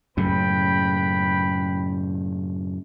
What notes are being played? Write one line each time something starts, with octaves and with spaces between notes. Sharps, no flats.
F#2 A2 C#3 B4 G5 B5